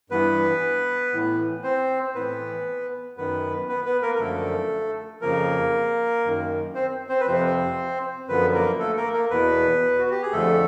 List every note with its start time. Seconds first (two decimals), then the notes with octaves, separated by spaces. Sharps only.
0.10 G2 E3 B3 B4
1.13 A2 E3
1.63 C4 C5
2.15 A2 E3 B3 B4
3.17 F#2 D#3 B3 B4
3.68 B3 B4
3.85 B3 B4
4.02 A#3 A#4
4.15 A#4
4.19 F#2 D3 F3 A3 A4
5.21 F2 C#3 F3 A#3 A#4
6.25 F#2 D#3
6.75 C4 C5
7.09 C4 C5
7.20 B4
7.27 F2 C3 F3 C4 C5
8.28 F#2 D3 F3 B3 B4
8.54 A#3 A#4
8.79 A3 A4
8.97 A#3 A#4
9.13 A#3 A#4
9.30 E2 B2 B3 B4
9.98 F#4
10.11 G4
10.22 G#4
10.33 F2 D3 F3 A3 A4